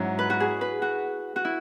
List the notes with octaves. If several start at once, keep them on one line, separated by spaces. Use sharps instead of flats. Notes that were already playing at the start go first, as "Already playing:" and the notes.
Already playing: G#2 F#3 C#4 E4 F#4
B4
F#4
G#4
B4
F#4
F#4
E4